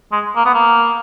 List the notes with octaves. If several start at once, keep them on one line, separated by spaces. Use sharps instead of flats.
G#3
A#3
B3
A#3